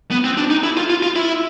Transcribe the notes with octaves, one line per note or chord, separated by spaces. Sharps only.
B3
C4
D4
D#4
E4
F4
F4
F4
E4